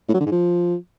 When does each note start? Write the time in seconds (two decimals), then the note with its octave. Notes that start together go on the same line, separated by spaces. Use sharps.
0.08 A2
0.14 F#3
0.20 D3
0.26 G#2
0.32 F3